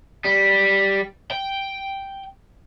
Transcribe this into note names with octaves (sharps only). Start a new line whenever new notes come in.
G3
G5